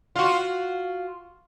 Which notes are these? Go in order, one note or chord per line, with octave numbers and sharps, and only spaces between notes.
F4 F#4